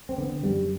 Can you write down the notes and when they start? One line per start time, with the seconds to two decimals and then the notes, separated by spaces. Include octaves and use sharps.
0.09 C4
0.18 D3 B3
0.43 F#2 G3